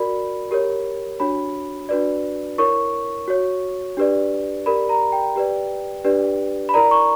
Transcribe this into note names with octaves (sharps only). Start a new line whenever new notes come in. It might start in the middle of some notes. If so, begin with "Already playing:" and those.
Already playing: F#4 A#4 D5 B5
G4 A#4 C#5
D4 F#4 C#5 B5
D4 F#4 B4 D5
E4 A#4 C#5 C#6
F#4 C#5
D4 G4 B4 D5
G4 A#4 D5 B5
A#5
G5
G4 B4 D5
D4 G4 B4 D5
B5
E4 A#4 D5 A#5
C#6